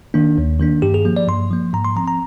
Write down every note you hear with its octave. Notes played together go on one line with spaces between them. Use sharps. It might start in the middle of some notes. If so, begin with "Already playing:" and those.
D#3 A#3 D4
D#2
D#3 A#3 D4
G2 G4
G#4
F3 A#3
D5
G2 C6
F3 A#3
G#2 A#5
C6
F3 C4 A#5
A#5